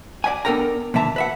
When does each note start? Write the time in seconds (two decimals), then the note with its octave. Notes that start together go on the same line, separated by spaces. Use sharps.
0.24 D5 E5 F#5 G#5
0.45 B3 D4 A4 A#4 G5 A#5
0.94 A#2 D3 E3 E5 A5 A#5
1.16 B4 E5 F#5